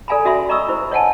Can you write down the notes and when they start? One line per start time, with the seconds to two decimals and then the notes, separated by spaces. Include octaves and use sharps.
0.08 A4 D5 F5 G#5 A#5 B5
0.25 C#4 F#4 E5 F5 B5 C6
0.49 D#5 A#5 B5 C#6 D#6 E6
0.68 E4 C5
0.91 C#5 D#5 F5 F#5 G#5 A5